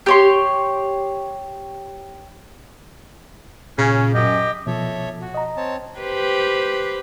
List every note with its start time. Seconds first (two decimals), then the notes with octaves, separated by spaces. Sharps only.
0.06 G4 C#5 C6
3.78 A#2 C#3 C#4
4.14 F#2 G4 D#5
4.67 B2 F3 A4 C#5 E5
5.21 F#4
5.34 D#5 A#5
5.57 C4 C#5 A5
6.00 G4 B4 C5